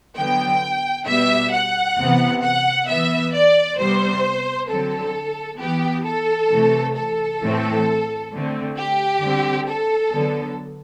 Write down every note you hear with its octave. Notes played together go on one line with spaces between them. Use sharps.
D3 F#3 B3 G5
B2 G3 B3 E5
F#5
C3 E3 B3
F#5
E3 B3 E5
D5
C3 G3 B3 C5
D3 F#3 C4 A4
E3 B3 G4
A4
C3 E3 A3
A4
A2 E3 A3 C4
D3 A3 C4
G4
D3 G3 C4
A4
D3 F#3 B3